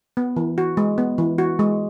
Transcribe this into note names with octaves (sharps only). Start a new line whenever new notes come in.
B3
E3
F#4
G#3
B3
E3
F#4
G#3